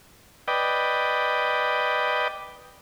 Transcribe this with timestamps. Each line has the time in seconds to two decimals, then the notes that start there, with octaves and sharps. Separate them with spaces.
0.48 B4 D5 D#5 G5